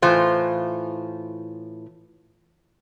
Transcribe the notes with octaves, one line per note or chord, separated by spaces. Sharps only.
A2 E3 F4 C5